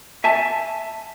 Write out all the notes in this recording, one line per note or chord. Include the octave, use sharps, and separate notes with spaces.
E5 G#5 A5